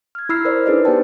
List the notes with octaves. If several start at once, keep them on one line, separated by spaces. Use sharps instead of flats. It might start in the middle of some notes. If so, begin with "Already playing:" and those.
F6 G#6
E4 B5 E6 F6 C7
A#4 C5 D5
D4 D#4 G#4 B4 D#5
B3 D#4 G4 C5 G5 A5